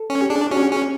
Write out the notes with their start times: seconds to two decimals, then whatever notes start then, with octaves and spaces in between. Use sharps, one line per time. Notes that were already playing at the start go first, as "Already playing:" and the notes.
Already playing: A4
0.10 C#4
0.22 G4
0.30 D4 G#4
0.50 C#4 F#4
0.61 G4
0.71 C#4 G#4